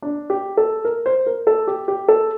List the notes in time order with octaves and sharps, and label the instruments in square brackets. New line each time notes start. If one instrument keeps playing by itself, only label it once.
[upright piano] D4
G4
A4
A#4
C5
A#4
A4
G4
G4
A4